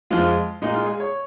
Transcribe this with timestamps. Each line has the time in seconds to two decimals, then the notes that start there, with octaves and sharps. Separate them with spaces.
0.10 F2 F3 G#3 F4
0.62 A#2 G#3 D#4
0.74 F4
0.86 G#4
1.00 C#5